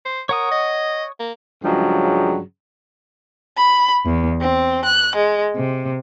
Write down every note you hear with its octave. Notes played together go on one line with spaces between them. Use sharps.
C5
A#4 C#5 F#5 D#6
D#5
A#3
G2 C#3 F3 F#3 G#3
B5
E2
C4
F#6
G#3
C3